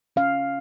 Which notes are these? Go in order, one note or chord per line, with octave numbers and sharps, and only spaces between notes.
C#4 F5